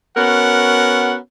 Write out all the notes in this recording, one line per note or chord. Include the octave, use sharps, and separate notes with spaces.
B3 C#4 F#4 A#4 F#5